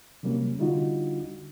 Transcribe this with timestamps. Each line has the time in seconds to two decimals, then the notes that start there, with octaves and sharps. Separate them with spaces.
0.23 C3 F#3 G3 A#3 C#4
0.59 D3 G3 D4 D#4 F4 F#4